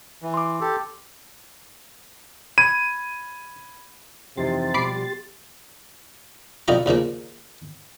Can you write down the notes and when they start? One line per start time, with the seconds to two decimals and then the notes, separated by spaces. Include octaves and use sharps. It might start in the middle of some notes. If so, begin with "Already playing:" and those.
0.22 E3
0.34 C6 D6
0.61 G4 A4
2.58 B5 G#6 D#7
4.37 F2 C3 E3 D#4 G4 C6 A6
4.74 B2 F3 G3 B5 D6 C7
6.68 B1 F2 D3 D#4 F4 A#5
6.86 D#2 C#3 F3 A#3